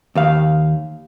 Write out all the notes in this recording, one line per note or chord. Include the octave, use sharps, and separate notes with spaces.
D#2 F5